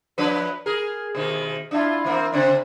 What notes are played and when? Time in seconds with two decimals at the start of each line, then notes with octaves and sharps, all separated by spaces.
0.18 F3 D4 B4
0.66 G#4 A#4
1.15 B2 D#3
1.71 D4 E4 F4
2.04 E3 A#3 C4
2.32 C#3 C4 D4